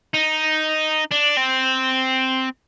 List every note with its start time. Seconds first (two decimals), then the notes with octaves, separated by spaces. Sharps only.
0.14 D#4
1.12 D4
1.37 C4